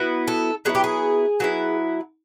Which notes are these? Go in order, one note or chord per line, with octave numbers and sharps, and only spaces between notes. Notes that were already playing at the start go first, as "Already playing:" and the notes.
Already playing: F#3 B3 E4
A4
F#3 B3 E4 G#4
G4
G#4
F#3 B3 E4